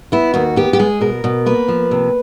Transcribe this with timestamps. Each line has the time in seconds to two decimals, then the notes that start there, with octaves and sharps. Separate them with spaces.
0.12 B3 E4
0.34 D#2 F#4
0.56 B3 G4
0.73 G4
0.79 G#3 G#4
1.01 B2 A#4
1.24 B2
1.46 A#3 B4
1.68 F3
1.91 C3